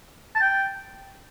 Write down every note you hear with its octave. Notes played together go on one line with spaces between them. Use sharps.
A5
G5